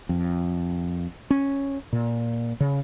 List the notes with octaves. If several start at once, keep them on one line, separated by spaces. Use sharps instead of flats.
F2
C#4
A#2
C#3